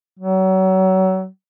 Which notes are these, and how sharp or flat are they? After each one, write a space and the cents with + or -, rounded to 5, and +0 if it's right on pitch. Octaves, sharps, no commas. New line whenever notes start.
F#3 +30